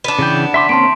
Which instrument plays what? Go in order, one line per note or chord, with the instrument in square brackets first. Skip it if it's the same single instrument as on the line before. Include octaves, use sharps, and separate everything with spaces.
[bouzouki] B3 D4
[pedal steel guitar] C#3 E3 G5
[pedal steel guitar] E5 C6 D6 [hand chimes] B6
[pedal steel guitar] A#3 C4 C#4 [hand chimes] A5 C6 D7